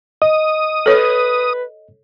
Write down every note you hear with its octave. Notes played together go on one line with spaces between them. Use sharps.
D#5 D#6
A4 B4 C#5